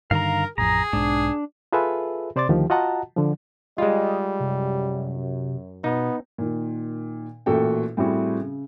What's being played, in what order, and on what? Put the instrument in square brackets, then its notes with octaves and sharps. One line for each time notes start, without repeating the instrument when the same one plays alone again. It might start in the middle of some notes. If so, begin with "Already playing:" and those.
[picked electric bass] G2 D3 D#3 [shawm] A#4 [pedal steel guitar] F5 A#5
[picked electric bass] A1 F2 [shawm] G#4 [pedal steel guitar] A#5
[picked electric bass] B1 G#2 [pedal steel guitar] D4
[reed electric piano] F4 G#4 A4 B4 E5
C3 C5 D5 C6 D6 A6
D2 D#3 F3 G4
F4 F#4 D#5 F#5 A5 A#5
D3 F3
[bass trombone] G3 [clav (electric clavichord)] G#3 F4 [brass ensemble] G#4 D#5
[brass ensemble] F#2 [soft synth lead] C3
[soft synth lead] B2 [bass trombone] B3 [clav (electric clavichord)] D#4
[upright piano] A#2 D#3
A1 A#2 A3 F#4 A4 G5
A2 G3 C4 E4 F#4 G#4
C#3